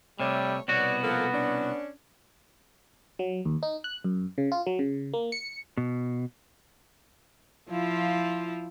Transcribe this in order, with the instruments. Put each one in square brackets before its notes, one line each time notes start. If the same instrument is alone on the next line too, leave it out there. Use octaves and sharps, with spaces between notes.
[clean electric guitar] C3 [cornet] G3 [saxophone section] A3 C#5
[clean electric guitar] C2 B2 F#4 [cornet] B3 [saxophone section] C#5 D5
[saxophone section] F3 A#3 A4
C#4 D4
[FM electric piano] F#3
D#2
D#4
F#6
F#2
C#3
F4
F#3
C#3
A#3
C#7
[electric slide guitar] B2
[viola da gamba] F3 E4 F4